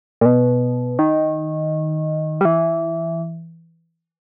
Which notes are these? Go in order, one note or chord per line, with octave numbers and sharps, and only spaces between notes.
A#2
B2
D#3
G3
E3